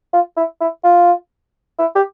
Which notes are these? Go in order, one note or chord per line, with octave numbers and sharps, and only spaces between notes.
F4
E4
E4
F4
E4
G4